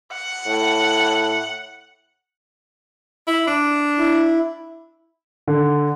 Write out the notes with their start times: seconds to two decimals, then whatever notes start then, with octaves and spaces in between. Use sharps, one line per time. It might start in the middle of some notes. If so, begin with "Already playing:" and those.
0.13 F#5
0.47 A2
3.28 E4
3.47 D4
3.98 E4
5.48 D3